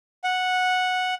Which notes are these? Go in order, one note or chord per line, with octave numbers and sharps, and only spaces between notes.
F#5